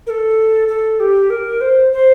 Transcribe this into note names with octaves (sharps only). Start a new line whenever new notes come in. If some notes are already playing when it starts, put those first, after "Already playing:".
A#4
A4
A4
G4
A#4
C5
C5